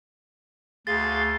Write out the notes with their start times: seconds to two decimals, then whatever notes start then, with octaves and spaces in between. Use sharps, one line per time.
0.87 D2 G#4 F5 C6 A6